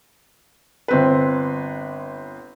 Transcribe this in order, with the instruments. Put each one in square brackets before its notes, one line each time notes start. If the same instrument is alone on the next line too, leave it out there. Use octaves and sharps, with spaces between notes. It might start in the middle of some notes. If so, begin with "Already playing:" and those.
[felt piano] G1 C4 B4